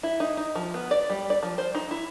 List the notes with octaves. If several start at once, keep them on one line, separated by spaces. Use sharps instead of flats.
E4
D#4
D#4
F3
B3
D5
G3
D5
F3
C5
D#4
E4